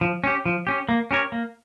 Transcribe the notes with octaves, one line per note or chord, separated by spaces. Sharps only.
F3
C#4 G4
F3
C#4 G4
A#3
C#4 G4 A#4 C#5
A#3